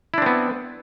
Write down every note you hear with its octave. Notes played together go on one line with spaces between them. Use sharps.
B3 C4 D4 E4